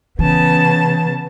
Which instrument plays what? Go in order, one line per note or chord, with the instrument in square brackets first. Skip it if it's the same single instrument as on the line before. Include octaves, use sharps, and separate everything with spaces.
[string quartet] C#3 B3 A5 [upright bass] E3